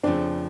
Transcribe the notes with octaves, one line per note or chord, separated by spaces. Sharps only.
F2 C#3 F3 A3 C4 D4